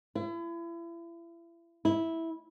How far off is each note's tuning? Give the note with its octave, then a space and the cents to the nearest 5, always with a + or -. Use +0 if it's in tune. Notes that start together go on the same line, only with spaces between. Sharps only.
E4 +35
E4 -10